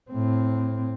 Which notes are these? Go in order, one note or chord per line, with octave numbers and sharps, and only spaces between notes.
A2 C4